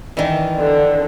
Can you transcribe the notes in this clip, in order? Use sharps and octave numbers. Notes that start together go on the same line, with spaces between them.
D#3 E3 D5
D3